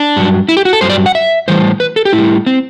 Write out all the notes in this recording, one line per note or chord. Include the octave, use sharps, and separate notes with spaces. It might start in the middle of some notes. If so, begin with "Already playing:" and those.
Already playing: D4
G2 F#3
E4
G4
F#4
A4
G2 F#3 C5
D5
F#5
E5
A2 E3 G3 C5
B4
A4
G4
A2 E4
G3
C4